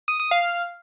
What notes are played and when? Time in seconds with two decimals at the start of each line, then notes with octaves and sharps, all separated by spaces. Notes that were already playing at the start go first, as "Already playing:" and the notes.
0.08 D#6
0.20 D#6
0.31 F5